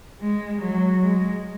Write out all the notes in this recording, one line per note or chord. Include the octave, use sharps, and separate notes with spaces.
G#3
F#3
G#3